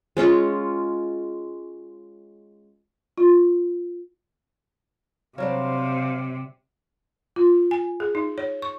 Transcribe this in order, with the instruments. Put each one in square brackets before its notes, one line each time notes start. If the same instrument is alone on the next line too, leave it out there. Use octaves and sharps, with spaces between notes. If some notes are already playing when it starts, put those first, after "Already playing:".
[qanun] G#3 C#4 F4 C#6
[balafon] F4
[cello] C3 [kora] F#3 G3 D4 [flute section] C5 [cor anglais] F5
[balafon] F4
G#5
G#4
D#4
C#5
C#6